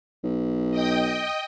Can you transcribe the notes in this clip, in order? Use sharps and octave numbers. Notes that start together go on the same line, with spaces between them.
B1
D#5 G5 D#6